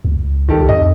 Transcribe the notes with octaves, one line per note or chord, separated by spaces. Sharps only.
C#2
C2 D#3 G4 A4
F2 D#5